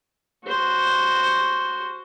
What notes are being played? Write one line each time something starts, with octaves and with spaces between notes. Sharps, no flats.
F#4 C5